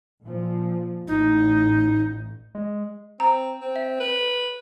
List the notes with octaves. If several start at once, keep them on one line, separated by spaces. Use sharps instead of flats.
A#2 F3
A1 A2 D#4
G#3
C4 A#5
C4
E5
B4